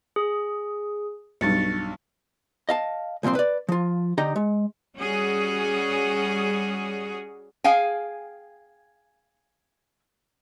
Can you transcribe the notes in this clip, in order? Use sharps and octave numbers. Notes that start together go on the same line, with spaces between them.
G#4
B1 G2 C#6 A6 C#7
D#5 F5 A5
C2 A#2 F3 C4 C6
B4 D5
F3 F4
D3 D#4 G4 D#5 A#5
G#3
G3 C#4 F#4 G#4
G#4 F5 G5 G#5